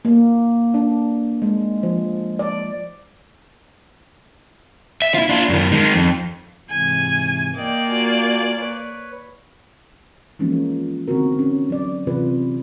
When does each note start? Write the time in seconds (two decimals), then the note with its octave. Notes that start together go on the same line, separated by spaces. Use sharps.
0.05 A#3
0.74 D4
1.42 G#3
1.83 F3
2.39 D5
5.02 E5
5.15 E4 F4
5.29 D4 F4
5.49 F#2 D#3
5.72 D#3 G#3
5.94 F2
6.69 G#2 C3 E3 G#5
7.56 A#3 D5 D#5 G5
7.87 F4 F#4 G#5
8.57 B4 C#5
10.39 E3 F3 G#3 A#3 C#4 D#4
10.53 F4
11.08 D3 D#3 B3 C4 F#4 A#4
11.39 C#4
11.70 F#3 D5
12.07 C3 E3 F4 G#4 B4